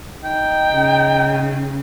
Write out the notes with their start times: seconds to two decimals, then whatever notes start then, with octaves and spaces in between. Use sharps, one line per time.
0.24 D#4 G5
0.73 C#3